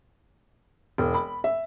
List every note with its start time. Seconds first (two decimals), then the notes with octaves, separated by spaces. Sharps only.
0.98 E1
1.14 B5
1.44 E5